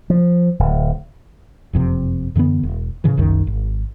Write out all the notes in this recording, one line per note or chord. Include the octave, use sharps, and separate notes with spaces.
F3
D1
F#1 F2 C3
F#2 D3 E3 B3
E1
A2 C#3 E3
F#1 C2 F#2 D#3
G#1